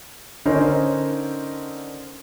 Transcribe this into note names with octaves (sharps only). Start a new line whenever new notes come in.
D3 C#4 D#4 A#4 C5